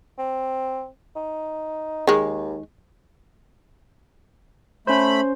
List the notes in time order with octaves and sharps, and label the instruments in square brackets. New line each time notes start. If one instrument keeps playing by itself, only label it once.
[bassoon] C4
D#4
[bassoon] D#2 [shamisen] D#3 G#3
[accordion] A3 B5 [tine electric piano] C#4 C5